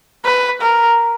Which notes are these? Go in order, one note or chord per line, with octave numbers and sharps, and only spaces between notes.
B4
A#4